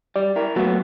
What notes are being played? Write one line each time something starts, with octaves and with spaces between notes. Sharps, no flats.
G3 D5
E4 A#4
A#2 F#3 A3 B3 F#4